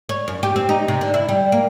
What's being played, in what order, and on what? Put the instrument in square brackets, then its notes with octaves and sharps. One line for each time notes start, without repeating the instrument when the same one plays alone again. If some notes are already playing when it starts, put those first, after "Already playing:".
[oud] C#5
F#2
G4
C4
D#4
C3
D3
E4
G3
A#3